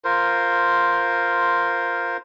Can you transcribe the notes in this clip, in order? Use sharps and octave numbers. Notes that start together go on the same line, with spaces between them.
F4 A#4 C5